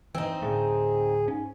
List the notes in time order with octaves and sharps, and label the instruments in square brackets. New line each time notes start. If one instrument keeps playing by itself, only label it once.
[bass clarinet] G2 [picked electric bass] E3 [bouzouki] C4 D#4
[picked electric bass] D2 A2 A3 [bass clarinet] G#4
[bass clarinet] G#2 [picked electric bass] C#4